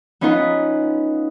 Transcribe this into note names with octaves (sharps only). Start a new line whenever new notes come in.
B3 C#4 D#4 F4 B4